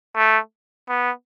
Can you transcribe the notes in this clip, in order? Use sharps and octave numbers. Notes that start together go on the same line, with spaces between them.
A3
B3